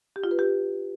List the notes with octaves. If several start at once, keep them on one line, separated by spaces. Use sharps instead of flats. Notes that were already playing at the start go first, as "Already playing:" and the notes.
G4
F4
B4
G4